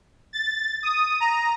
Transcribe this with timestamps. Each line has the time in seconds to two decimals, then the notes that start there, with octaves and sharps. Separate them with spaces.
0.33 A6
0.83 D#6
1.20 A#5